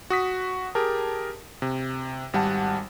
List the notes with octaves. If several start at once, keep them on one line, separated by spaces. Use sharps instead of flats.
F#4 D#6 B6
G4 G#4 A#4 A5
C3
G#1 G3 F#5 A5